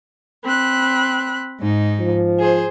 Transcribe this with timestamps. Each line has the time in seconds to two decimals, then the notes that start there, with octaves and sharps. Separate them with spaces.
0.44 C4 B5 F#6
1.60 G#2 D#4
1.99 F3
2.39 G#4 C5